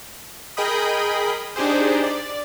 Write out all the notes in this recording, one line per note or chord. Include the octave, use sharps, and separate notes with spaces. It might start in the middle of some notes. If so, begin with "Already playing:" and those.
G#4 A#4 D#5 G5 B5 D#6
D4 D#4 G4 G#4 C5
D5